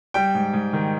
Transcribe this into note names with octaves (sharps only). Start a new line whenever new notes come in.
G3 G5
G#2
G#2
D#3